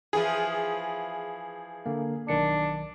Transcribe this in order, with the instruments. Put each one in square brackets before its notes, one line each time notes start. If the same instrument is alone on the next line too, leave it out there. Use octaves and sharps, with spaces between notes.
[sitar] E3 F3 [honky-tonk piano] G#4
[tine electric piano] D3 A#3
[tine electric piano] B1 D#3 C#7 [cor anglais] D4